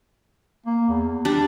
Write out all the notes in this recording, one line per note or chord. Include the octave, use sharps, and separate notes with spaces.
A#3
E2
G3 D4 D5